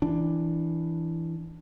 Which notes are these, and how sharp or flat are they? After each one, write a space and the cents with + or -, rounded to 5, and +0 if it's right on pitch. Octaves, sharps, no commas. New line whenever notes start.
E3 +0 D4 +0